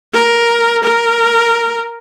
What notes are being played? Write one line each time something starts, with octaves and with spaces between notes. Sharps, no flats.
A#4
A#4